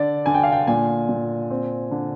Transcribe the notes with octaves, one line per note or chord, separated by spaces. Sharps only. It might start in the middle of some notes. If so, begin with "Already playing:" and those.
Already playing: D3 D5
D3 G#5
G5
F5
G5
A#2 G#5
A#2
C4
D3